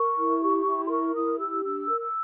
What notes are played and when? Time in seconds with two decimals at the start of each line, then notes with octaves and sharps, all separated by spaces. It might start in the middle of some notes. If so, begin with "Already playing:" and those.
Already playing: A#4 C#6
0.17 E4
0.42 G4
0.66 E4
0.86 C6
0.90 A#4 C#6
1.15 E4 D#6
1.39 G4 E6
1.63 D4 E6
1.88 A#4
2.00 E6